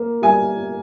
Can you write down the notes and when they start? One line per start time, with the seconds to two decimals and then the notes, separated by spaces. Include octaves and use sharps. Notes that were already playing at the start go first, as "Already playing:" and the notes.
Already playing: A#3
0.22 G3 G#5